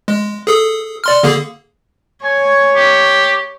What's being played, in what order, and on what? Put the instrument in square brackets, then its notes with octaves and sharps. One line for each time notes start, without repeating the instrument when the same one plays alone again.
[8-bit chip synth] G#3
G#4 A4 D#6
D5 C6 F6
D3 A#3 G#4
[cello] C#5 [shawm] G#5
[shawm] G4